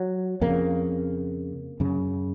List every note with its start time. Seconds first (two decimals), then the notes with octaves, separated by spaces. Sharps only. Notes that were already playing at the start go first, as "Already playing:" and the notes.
Already playing: F#3
0.41 F2 C#3 A#3
1.80 F#2 C#3